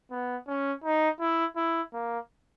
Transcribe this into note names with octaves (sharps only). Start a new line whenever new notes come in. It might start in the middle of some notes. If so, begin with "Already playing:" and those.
B3
C#4
D#4
E4
E4
A#3